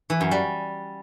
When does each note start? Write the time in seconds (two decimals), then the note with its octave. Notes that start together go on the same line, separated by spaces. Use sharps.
0.10 E3
0.21 F#2
0.31 G3